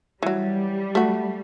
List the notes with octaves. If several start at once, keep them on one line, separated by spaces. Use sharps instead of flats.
E3 F#3 G3
A3 F#4